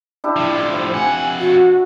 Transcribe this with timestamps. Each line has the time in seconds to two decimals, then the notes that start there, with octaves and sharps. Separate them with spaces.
0.24 D4 E4 G4
0.36 A2 F3
0.72 C5
0.93 F2 F#5 G#5
1.39 F#4